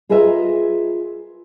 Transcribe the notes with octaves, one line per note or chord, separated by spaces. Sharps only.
F4 G#4 A#4 B4 D#5 E5